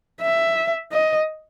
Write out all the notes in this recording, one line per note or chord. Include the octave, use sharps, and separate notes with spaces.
E5
D#5